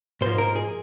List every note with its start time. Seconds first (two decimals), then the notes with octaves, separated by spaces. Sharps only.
0.21 G#2 F3 A#3 C5
0.38 A#4
0.56 G#4